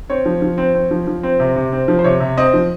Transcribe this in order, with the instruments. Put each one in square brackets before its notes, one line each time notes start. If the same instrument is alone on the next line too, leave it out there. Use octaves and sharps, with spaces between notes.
[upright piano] C4 C#5
F3
F3
C4
C4
F3
F3
C4
C3
C3
C4
F3
C5
C3 C#5
C3
C4 D#5
F3